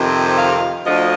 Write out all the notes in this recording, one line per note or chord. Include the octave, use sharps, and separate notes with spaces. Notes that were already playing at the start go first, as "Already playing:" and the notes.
Already playing: F2 C3 D#3
F5
D2 D3 F3 D#5